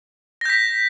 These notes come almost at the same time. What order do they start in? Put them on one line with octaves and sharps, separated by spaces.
A#6 G6 B6